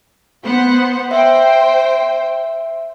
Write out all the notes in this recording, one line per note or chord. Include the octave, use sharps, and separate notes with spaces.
B3 C5 F#5
C5 E5 G5